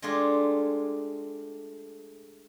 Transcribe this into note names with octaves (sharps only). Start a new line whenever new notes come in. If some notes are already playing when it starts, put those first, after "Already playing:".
G#3 A3 D4 F4 G4 G#4